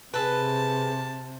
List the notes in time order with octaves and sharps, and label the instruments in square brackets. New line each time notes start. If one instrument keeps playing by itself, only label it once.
[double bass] C3 [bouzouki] G#4 A4 B4 [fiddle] A5